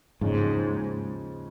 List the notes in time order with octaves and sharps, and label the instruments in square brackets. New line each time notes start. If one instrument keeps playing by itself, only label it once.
[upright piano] D#2 C#3 F3 G#3 C#4 [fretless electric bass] G#2